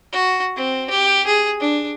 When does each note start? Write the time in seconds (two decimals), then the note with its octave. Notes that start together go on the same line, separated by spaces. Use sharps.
0.12 F#4
0.56 C4
0.90 G4
1.26 G#4
1.60 D4